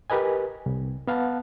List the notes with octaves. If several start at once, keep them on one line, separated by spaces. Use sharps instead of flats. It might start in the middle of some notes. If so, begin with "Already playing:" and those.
G4 A#4 B4 D#5 G#5
C2
B3 F5 F#5 A5